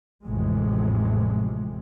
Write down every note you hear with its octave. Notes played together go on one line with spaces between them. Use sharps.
A1 F2 A2 C3 G#3